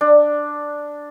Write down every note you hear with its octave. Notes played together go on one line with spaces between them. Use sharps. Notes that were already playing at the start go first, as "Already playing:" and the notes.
D4